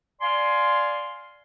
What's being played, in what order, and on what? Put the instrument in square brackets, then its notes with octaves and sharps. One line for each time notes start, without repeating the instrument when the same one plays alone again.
[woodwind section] D5 F5 G#5 C6